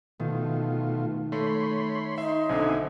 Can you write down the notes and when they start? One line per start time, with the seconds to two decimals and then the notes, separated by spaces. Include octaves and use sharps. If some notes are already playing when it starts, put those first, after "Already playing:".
0.20 B2 D#3 A3 F4
1.32 A3 C#5 B5 C6
2.18 D#4 E5 C6
2.49 B1 D3 C4 E5 G#5